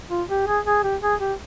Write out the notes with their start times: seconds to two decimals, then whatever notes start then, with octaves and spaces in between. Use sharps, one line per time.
0.10 F4
0.29 G4
0.47 G#4
0.66 G#4
0.83 G4
1.02 G#4
1.20 G4